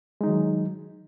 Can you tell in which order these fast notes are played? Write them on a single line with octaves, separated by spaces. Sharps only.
G#3 D#4 D#3 F#3